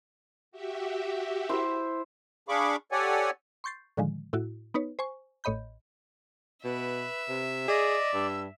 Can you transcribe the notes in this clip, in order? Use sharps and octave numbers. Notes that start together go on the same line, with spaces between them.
F#4 G4 E5
E4 C5
D4 G#4 F5 B5 C#6 D6
G4 A4 C#5 D5 F#5 G#5
C6 C#6 G6 A6 C7
A2 D3 D#3 F3 G#3
A2 E4 F#4
B3 D#4 B4 C#5
C5 G#5 C#6
A1 A2 C#5 D#5 B5 G6
B2 B4 E5
C3
G#4 D5 D#5
G2 E6